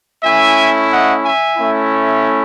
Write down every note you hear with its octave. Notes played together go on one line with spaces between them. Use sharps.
A3 C#4 E4 E5 G#5
D#5 F#5
E5 G#5
A3 C#4 E4